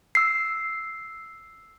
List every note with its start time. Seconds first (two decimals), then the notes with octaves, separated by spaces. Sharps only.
0.15 E6 C7